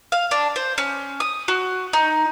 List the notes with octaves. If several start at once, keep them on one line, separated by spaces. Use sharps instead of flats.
F5
D4
C5
C#4
D#6
F#4
D#4